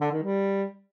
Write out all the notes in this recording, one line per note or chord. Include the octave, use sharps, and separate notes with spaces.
D3
D#3
G3